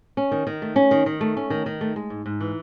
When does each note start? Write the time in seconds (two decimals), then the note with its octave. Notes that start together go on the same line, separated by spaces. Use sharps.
0.17 C#4
0.32 D#3
0.47 D#3
0.62 A3
0.76 C#4
0.91 D#3
1.06 D#3
1.21 A3
1.37 C#4
1.50 D#3
1.66 D#3
1.81 A3
1.96 G#3
2.10 G#2
2.26 G#2
2.40 E3